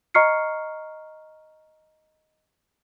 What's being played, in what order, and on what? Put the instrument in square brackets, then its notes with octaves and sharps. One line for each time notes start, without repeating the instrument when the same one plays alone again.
[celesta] D#5 A#5 C#6 F6 C7 C#7